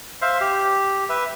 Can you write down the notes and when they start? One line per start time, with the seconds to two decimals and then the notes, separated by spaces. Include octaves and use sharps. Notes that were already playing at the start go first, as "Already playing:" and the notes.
0.22 C5 E5 F5
0.41 G4
1.09 B4 E5